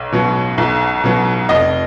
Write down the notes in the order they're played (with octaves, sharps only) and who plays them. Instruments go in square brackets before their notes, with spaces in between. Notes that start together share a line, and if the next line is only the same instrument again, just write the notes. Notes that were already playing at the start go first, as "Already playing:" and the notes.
Already playing: [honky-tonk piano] B1
B2 F#3
B1
B2 F#3
F1 D#5